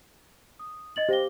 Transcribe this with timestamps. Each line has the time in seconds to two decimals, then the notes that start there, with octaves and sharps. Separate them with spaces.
0.59 D#6
0.96 D#5 A6 F#7
1.09 G4 C5 F5 A#6 G7